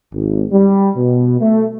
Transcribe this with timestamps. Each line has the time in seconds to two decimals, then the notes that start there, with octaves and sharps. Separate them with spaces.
0.13 G#1
0.52 G3
0.95 B2
1.40 A3